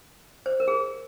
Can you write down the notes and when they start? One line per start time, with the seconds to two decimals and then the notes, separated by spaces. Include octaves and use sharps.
0.46 C5
0.60 A#4
0.68 G#4